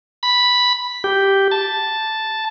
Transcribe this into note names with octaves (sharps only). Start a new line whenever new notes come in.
B5
G4
A5